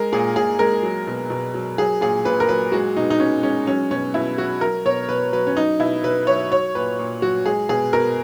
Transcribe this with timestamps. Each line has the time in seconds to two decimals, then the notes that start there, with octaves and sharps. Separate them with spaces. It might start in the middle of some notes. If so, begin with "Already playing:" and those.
Already playing: G#3 A#4
0.12 A#2 G#4
0.36 A#2 G#4
0.59 G#3 A#4
0.83 F#3
1.07 B2
1.30 B2
1.54 F#3
1.78 F#3 G#4
2.01 A#2 G#4
2.25 A#2 B4
2.40 A#4
2.49 F#3 B4
2.72 G#3 F#4
2.96 B2 D#4
3.10 D#4
3.20 B2 C#4
3.43 G#3 C#4
3.67 F#3 C#4
3.91 B2 C#4
4.14 B2 E4
4.38 F#3 F#4
4.61 F#3 A#4
4.85 B2 C#5
5.09 B2 B4
5.33 F#3 B4
5.47 C#4
5.57 F#3 D#4
5.79 B2 E4
6.03 B2 B4
6.27 F#3 C#5
6.51 F#3 C#5
6.75 A#2 B4
6.99 A#2
7.22 F#3 F#4
7.46 G#3 G#4
7.69 B2 G#4
7.93 B2 A#4